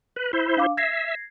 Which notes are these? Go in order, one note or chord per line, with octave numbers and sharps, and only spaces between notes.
B4
E4 C5
D4 F5 D6
E5 G#6 A#6 C7